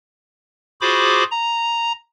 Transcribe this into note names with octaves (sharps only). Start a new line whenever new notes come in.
F4 F#4 G#4 C5 B5 D6
A#5